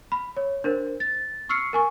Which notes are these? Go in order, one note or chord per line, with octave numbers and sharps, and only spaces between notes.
B5
C#5
D4 A#4 C5
A6
C#6 E6 F6 C7 C#7
A#4 G#5 C#6